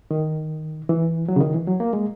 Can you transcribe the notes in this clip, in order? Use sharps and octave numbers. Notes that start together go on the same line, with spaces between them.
D#3
E3
F#3
C#3
D#3
E3
F#3
A#3
G#3